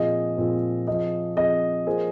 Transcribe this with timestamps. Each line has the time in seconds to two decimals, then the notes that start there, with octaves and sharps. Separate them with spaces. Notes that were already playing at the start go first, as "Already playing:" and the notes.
Already playing: A#2 F3 C4 F4 G#4 D#5
0.37 A#2 F3 C4 F4 G#4
0.87 F3 C4 G#4 D#5
1.36 F3 C4 G#4 D#5
1.86 F3 A#3 G#4 C5